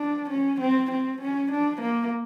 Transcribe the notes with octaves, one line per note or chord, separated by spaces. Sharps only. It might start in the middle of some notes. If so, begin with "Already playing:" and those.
Already playing: D4
C#4
C4
C4
C#4
D4
A#3